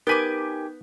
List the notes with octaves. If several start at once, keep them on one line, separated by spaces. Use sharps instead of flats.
B3 D#4 G4 A#4 B4 G#5 D6 G6